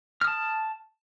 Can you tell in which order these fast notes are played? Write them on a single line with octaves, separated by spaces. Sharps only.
F6 D#6 A5